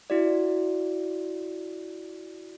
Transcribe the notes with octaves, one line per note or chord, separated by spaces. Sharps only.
E4 F#4 D5